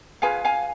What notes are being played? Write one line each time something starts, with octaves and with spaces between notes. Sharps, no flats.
F4 G#4 B4 F5 G#5
F5 G#5